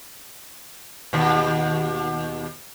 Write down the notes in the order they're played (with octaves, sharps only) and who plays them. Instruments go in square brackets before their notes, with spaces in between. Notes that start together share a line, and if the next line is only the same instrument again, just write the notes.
[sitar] D#2 B2